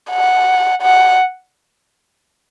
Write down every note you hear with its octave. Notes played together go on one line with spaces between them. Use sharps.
F#5
F#5